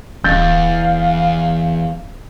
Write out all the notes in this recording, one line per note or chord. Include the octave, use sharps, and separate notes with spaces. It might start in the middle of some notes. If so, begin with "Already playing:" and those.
D1 E2 F5 G6 A6